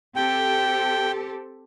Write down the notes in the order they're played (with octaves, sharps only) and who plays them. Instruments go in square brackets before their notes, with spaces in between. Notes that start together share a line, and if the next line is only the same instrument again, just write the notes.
[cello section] C4 G4 A4 [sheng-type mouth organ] G5